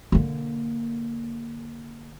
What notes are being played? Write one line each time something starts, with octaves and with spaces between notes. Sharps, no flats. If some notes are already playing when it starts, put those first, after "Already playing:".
D3 A#3